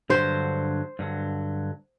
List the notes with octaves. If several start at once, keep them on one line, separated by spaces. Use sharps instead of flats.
G2 D3 F#3 C5
G2 D3 F#3